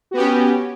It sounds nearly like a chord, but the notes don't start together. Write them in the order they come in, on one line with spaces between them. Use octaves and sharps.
F#4 B3 G4 C#4